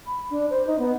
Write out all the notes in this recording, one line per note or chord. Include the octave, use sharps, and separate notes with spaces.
B5
D4
C5
D#4
B3